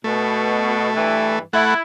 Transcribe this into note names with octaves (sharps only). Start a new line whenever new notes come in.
B2 A3
G2 E3
A3 E4 F#5